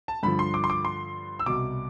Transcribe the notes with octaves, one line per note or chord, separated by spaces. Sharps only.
A5
G2 D3 F3 B5
C6
D6
C6
D6
C6
E6
C2 B2 D6